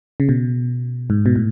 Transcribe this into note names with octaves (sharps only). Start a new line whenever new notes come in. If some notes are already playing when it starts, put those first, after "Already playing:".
C#3
B2
G#2
B2
A2